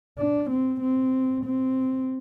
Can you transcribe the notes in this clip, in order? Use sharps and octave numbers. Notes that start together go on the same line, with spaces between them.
D4
C4
C4
C4